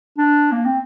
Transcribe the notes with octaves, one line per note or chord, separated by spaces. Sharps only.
D4
A#3
C4